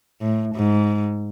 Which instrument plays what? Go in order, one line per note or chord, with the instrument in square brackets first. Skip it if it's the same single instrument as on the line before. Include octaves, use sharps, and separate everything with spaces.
[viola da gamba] A2
G#2